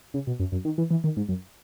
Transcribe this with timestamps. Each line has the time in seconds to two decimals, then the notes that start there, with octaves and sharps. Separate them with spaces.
0.14 C#3
0.27 B2
0.39 F#2
0.52 F#2
0.65 D#3
0.78 E3
0.91 E3
1.04 D#3
1.17 G#2
1.29 F#2